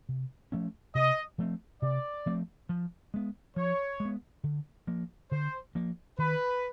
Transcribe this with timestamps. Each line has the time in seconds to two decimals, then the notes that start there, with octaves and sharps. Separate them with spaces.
0.09 C3
0.52 F3 A3 C#4
0.95 C3 D#5
1.38 F3 A3 C4
1.82 C3 D5
2.26 F3 A3 C4
2.69 F3
3.14 G#3 B3
3.56 F3 C#5
4.00 G#3
4.05 B3
4.44 D3
4.87 F3 A#3
5.31 D3 C5
5.75 F3 A#3
6.18 D#3 B4